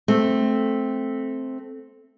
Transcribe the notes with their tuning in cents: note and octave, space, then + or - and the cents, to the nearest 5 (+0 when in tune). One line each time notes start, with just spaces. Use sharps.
A3 -10 C4 +0